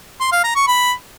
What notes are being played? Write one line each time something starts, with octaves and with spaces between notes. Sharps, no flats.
C6
F5
A#5
C#6
B5